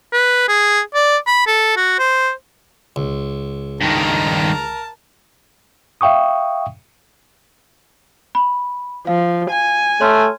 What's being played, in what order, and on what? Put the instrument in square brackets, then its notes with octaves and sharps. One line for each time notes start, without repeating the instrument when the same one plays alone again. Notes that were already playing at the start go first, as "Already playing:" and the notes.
[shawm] B4
G#4
D5
B5
A4
F#4
C5
[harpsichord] C#2
[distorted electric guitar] G2 D#3 [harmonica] A#4 A5 A#5
[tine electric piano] E5 F5 G5 C#6 D#6
[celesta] B5
[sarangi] F3 [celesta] F5
[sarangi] G#5
[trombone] A3 [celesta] C#5 C6 F6